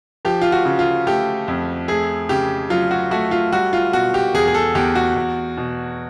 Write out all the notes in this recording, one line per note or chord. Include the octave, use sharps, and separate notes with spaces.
F3 G4
F4
F#4
C#3
F4
A3 G4
F2
A3 G#4
C#3 G4
F#3 F4
F#4
A3 F#4
F4
G3 F#4
F4
B2 F#4
G4
E2 G#4
G#4
A4
E2 G4
F#4
E2
B2